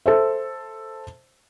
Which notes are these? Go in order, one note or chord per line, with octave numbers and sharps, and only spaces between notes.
A4 C5 E5